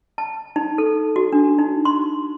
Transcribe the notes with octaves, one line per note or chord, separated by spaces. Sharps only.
A5
D#4
A4
F#4
D4
D#4
C6